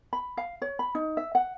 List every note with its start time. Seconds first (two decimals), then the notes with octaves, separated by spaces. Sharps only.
0.13 B5
0.37 F5
0.62 C#5
0.79 B5
0.95 D#4
1.17 E5
1.35 F#5